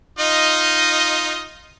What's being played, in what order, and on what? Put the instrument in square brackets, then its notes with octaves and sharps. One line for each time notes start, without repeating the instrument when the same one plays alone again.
[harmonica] D#4 F4 D#5